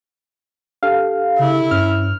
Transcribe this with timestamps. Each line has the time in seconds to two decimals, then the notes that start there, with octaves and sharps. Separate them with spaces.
0.83 D4 G4 A4 F5
1.39 C#3 E4
1.71 G2 C#4 F6